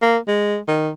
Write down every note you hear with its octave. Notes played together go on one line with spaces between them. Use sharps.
A#3
G#3
D#3